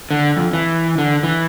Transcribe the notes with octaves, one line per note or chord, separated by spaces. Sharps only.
D3
F2
E3
D3
E3